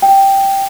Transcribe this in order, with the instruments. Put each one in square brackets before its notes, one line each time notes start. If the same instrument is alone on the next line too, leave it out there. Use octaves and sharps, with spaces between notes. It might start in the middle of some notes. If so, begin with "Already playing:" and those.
[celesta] G5